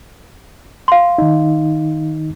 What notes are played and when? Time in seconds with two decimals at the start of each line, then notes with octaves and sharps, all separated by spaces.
0.88 F5 C6
1.18 D#3 D#4